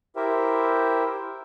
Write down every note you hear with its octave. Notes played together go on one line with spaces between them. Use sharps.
E4 G4 A#4 C5 E5 G5